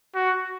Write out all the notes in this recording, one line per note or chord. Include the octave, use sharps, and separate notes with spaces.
F#4